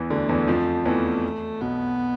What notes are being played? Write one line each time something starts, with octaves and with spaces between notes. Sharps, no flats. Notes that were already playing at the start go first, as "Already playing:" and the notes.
Already playing: E2 E3
D2 D3 A3
E2 E3
F2 F3
E2 E3 A3
B1 B2 B3